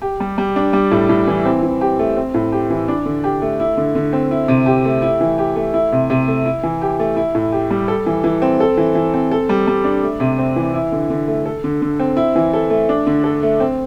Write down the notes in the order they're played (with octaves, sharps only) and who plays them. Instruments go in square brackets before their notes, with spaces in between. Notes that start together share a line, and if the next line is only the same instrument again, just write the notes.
[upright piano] G4
G3
G3
D4
G3
A2
A2
E3
C4
E3
G4
A3
C4
A2
G4
E3
D4
D3
G4
A3
E4
D3
D3
C4
E4
C3
G4
A3
E4
E3
G4
A3
E4
C3
C3
A3
E4
E3
G4
A3
E4
A2
G4
G3
A4
E3
E3
C4
A4
E3
E3
C4
A4
G3
G3
D4
A3
C3
C4
E3
E4
D3
D3
A3
A4
D3
D3
C4
E4
E3
A4
A3
D4
D3
A4
A3
C4